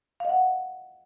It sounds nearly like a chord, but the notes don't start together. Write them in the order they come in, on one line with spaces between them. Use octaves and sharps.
F5 D#5 F#5